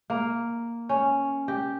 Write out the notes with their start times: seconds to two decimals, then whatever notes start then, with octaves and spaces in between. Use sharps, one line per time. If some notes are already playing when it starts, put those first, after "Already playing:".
0.10 A#3
0.89 C#4
1.48 G4